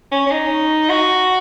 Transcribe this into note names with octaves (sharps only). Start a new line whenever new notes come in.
C#4
C#4
D#4
F#4